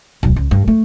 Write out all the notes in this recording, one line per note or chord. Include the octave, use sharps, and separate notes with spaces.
D1 B1
C#2
G2
A3